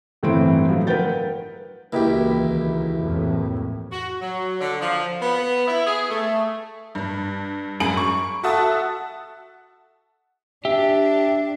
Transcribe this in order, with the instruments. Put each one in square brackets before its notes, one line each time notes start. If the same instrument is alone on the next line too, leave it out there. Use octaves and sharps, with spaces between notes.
[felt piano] G1 A2 E3 C4 C6 D7
F3 F#3 A3
A#4 B4 F#5 G5 G6 A6
[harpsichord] C#2 B2 [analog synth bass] E3 [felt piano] A#3 E4 G4
[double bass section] D#2
F2 A2
[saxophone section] F#4
F#3
D3
F3
B3
E4
G#4
A3
[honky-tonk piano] G2
F#2 G#3 G#4 B5 D7 F#7
C#6
F#4 A4 E5 F#5 A5 D#6
[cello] D4 [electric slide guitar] G4 [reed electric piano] E5